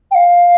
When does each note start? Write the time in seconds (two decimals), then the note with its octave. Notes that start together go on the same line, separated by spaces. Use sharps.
0.11 G5
0.15 F5